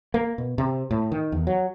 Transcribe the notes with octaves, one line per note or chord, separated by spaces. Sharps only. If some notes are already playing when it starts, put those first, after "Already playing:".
A#3
B2
C3
A2
D#3
E2
F#3